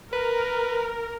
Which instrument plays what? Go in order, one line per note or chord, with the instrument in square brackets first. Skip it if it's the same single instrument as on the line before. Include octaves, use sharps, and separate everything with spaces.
[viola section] A#4 [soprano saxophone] B4